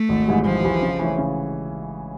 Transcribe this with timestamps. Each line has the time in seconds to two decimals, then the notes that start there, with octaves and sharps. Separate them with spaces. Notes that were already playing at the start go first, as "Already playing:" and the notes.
Already playing: A3
0.09 G#1
0.28 G#2 E3 G3
0.45 G#1 F3
0.63 G#2 E3 G3
0.82 C#3
0.99 E3 A3 C#4
1.18 C#3